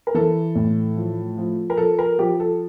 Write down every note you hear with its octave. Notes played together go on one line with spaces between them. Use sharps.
A#4
E3 A4
A2
F3
F3
A#4
F3 A4
A#4
F3 G4
A4